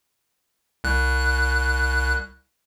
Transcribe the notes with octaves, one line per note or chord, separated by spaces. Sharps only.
C2 F#6